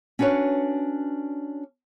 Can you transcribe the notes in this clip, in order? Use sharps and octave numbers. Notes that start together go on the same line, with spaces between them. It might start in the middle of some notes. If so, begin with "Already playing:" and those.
C#4 D4 F#4 B4 C#5